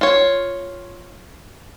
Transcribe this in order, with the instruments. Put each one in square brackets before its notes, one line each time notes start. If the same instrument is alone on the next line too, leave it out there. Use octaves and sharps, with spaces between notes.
[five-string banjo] F4 C#5